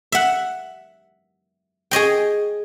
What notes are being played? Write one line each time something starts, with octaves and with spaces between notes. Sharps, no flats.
E5 F#5
G#4 C#5 D#5 G5